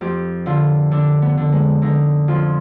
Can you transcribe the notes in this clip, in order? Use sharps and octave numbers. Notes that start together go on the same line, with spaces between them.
F2 G4
D3 F4
D3 D4
B3
D3
G#3
D3 D#4
F2 F4